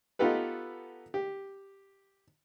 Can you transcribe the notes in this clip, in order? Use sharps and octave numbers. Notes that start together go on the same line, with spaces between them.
B3 D#4 F4 G4 A4 B4
G4